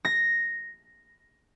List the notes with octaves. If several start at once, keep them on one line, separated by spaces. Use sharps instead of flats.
A#6